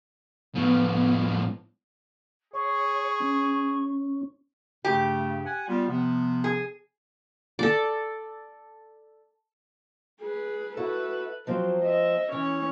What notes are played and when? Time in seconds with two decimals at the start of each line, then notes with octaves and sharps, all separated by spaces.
0.56 A2 F3 B3
2.53 G#4 C#5 C#6
3.20 C#4
4.85 G2 C#3 A3 G4
5.45 F#5 G#5
5.67 G3 B3 F4
5.88 C3 F3 B3
6.44 G#4
7.59 A4 D5
10.21 G#4 B4
10.77 E4 F#4 A4 B4 E5
11.47 F3 F#3 C4 C5
11.83 D#5 E5
12.32 E3 C#4 C#5